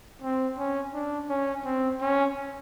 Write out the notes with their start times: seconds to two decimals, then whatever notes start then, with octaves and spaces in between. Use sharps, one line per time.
0.22 C4
0.58 C#4
0.93 D4
1.29 C#4
1.64 C4
2.01 C#4